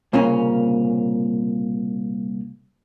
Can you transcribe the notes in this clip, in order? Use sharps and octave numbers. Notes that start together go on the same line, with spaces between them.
C2 A#2 C#3 A#3 C#4